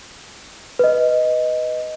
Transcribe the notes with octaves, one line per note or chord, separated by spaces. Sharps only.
B4 D#5